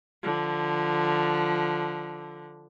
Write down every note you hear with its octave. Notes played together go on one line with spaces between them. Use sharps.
D3 F3